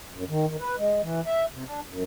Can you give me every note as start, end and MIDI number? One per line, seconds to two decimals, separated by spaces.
0.13 0.24 42
0.29 0.46 51
0.47 0.57 51
0.60 0.76 71
0.77 1.01 56
1.02 1.21 52
1.26 1.45 76
1.52 1.64 48
1.66 1.80 62
1.88 2.03 42